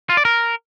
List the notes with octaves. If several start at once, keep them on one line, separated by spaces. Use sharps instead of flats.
F4
D5
A#4